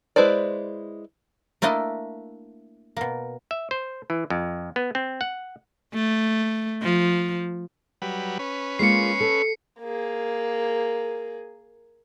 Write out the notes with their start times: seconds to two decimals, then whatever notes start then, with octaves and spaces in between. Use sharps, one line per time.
0.16 G#3 E4 B4 C5 D5
1.62 A3 A#3 D4 E4 D#5
2.97 B2 A#3
3.51 E5
3.71 C5
4.10 E3
4.30 F2
4.76 B3
4.95 C4
5.21 F#5
5.94 A3
6.82 F3
8.02 F#3 G3 B4
8.39 C#4 B4
8.79 G#3 A#3 F4 C7 C#7
9.20 A4
9.80 A#3 G#4